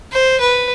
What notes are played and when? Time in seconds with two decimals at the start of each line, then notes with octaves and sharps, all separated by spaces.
0.12 C5
0.40 B4